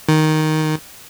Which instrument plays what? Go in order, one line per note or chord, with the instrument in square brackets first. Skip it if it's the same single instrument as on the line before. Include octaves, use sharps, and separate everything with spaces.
[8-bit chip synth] D#3